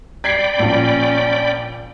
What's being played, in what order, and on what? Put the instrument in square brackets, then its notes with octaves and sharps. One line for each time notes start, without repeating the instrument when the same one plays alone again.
[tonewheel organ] D5 G5 B5 [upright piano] G#6 B6 C7
[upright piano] A#1 [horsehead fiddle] C#4